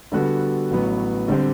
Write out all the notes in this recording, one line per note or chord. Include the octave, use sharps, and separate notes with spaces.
D3 G3 B3 F#4 A4
A1 A2 F#3 B3
D3 G3 C4 G4